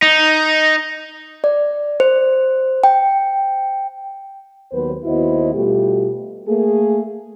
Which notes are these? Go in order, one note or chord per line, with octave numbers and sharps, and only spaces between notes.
D#4
D5
C5
G5
D#2 F#3 B3 B4 C5
D#2 B3 E4 F#4 C5 D#5
B2 G3 A3 F4 G4
A3 A#3 G#4